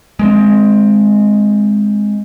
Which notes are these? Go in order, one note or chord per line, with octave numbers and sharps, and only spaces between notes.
G#3 A#3 C4